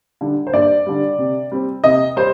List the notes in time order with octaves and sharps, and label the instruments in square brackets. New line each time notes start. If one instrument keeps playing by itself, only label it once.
[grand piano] D3 G3
C5
G2 D5
D3 G3
C3
G3 C4
C3 D#5
G3 C5